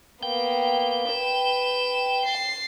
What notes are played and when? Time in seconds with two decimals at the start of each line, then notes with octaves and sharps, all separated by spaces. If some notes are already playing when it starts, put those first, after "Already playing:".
0.23 A#3 B3 G5
1.11 B4 E7
2.25 A6 C7